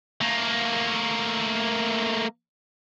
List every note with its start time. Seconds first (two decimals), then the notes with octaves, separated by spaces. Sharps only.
0.21 A3 A#3